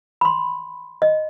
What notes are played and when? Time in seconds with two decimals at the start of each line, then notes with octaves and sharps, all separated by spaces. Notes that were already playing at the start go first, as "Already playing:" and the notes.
0.21 B5 C6
1.02 D#5